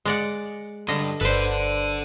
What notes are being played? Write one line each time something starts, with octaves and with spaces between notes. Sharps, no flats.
G#3 D5 F#5
G2 D3 D#5
G1 A4 B4 C5 D5